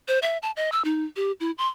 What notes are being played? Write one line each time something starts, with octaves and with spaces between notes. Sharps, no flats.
C5
E5
A5
D#5
E6
D#4
G4
E4
C6